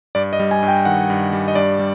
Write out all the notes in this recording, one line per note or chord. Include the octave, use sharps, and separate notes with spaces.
G2 D5
D#5
G3
G#5
G2
G5
D#3 F#5
G2
G3
D#5
G2 D5
G3